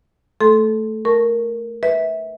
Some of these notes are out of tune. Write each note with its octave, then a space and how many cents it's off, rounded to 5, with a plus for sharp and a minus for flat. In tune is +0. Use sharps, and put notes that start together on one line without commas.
A3 +0 A4 -15 C6 +0
A#4 +0 A5 +0 C#6 +0
B4 +0 E5 -25